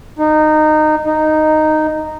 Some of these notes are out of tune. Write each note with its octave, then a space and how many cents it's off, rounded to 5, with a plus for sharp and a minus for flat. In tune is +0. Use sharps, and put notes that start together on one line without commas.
D#4 -20
D#4 -10